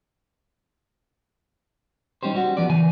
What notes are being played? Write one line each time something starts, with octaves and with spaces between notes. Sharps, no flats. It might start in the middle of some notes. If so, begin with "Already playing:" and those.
G3 C#4 D#4 G4 C5
G3 F#4
F3 B3 D5
C#3 E3 G#5